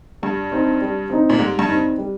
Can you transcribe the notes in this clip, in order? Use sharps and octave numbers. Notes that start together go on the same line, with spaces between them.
G2 G3
C4 D#4
G3
C4 D#4
A#2
G#2 G3
G2
C4 D#4
G3